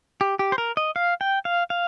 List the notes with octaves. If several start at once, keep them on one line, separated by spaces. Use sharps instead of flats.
G4
G4
C5
A#4
D#5
F5
G5
F5
F5